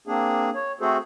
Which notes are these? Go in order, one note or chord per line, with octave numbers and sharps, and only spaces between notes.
A#3 C4 D4 G#4
C#5
A3 C4 F#4 G#4 A4 C5